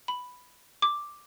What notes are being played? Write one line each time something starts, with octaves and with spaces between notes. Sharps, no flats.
B5
D6